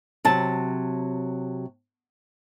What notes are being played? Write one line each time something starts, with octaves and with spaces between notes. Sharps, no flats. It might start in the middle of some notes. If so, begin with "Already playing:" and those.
C3 F#3 A5